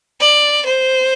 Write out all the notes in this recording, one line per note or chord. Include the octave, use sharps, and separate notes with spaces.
D5
C5